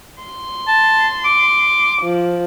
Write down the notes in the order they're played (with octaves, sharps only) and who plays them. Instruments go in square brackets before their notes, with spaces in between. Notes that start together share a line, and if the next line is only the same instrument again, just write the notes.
[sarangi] C6
[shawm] A5
D6
[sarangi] F3